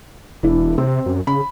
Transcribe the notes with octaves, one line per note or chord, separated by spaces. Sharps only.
E1 E3 D4 E4
C3 C4
F#2
C#3 B5